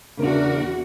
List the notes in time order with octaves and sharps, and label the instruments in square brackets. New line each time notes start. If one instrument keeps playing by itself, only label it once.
[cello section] E2 F#4 [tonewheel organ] C#3 A#4 [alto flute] D4